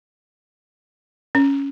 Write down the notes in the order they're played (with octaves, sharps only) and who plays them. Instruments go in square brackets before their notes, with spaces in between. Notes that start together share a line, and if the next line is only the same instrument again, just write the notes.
[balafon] C#4